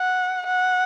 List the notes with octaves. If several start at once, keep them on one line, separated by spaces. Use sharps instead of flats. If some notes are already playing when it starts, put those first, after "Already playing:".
Already playing: F#5
F#5